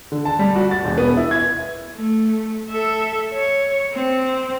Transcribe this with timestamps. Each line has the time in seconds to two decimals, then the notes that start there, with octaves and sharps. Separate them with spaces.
0.12 D3
0.25 A5
0.39 G3
0.56 F#4
0.71 A6
0.85 E1
0.98 B3
1.17 E4
1.31 G#6
1.96 A3
2.69 A4 E5
3.32 C#5
3.93 C4